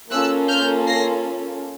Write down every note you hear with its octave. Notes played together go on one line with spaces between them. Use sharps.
A#3 C#4 F4 A4 E6 F#6
F6 G6
A#6 C7